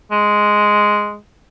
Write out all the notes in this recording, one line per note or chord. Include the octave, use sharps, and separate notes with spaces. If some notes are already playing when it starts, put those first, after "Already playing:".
G#3